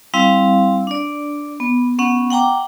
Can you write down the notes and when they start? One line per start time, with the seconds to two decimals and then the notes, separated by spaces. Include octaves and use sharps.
0.14 G3 C4 E4 F5
0.87 D4 D5
1.60 B3
1.99 B3 C#4 F#5
2.30 F#5 G5 A#5 D6